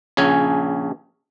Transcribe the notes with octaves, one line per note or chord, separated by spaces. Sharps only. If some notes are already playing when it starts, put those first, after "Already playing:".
A#1 C#3 C#4 G#5